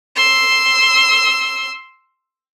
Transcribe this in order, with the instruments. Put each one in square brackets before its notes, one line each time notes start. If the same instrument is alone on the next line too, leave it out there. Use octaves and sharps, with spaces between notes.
[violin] C6 E6